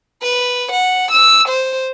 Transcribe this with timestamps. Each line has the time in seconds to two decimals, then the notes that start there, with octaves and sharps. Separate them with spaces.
0.22 B4
0.71 F#5
1.11 E6
1.48 C5